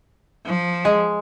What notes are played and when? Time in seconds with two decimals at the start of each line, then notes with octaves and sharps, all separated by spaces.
0.47 F3
0.85 G#3